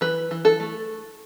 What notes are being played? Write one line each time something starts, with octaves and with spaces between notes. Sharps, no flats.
E3 B4
E3
A4
A3